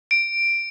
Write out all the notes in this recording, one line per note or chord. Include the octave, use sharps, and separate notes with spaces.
D7